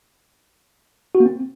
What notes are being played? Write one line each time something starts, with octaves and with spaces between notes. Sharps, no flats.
F#4
A#3
C4